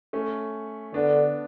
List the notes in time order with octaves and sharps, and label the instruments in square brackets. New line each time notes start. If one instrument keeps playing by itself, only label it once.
[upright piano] A3 C#4
[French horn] D3 [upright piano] B3 D4